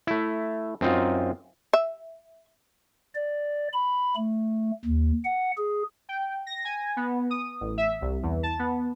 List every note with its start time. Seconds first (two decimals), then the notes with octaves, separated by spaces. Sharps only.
0.07 A3 E4
0.81 F#2 C4 D#4 F4
1.73 E5
3.15 D5
3.73 B5
4.16 A3
4.85 D#2
5.25 F#5
5.58 G#4
6.09 G5
6.47 A#6
6.65 G#5
6.97 B3
7.30 D#6
7.61 A1
7.78 E5
8.01 C2
8.23 E2
8.43 A5
8.59 B3